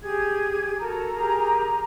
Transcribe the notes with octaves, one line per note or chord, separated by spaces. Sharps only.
G4 G#4 G#6
F#4 A4 A#4 A#5
G4 G#4 A#4